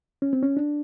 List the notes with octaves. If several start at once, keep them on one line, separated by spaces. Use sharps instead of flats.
C#4
C4
C#4
D4